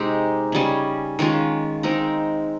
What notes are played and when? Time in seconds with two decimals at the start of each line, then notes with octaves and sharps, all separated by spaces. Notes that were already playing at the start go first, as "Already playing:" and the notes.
Already playing: C3 G#3 C4 D#4 G4
0.52 C#3 G3 C#4 G#4
1.19 D#3 G#3 C#4 F4
1.83 G#3 C4 D#4 A#4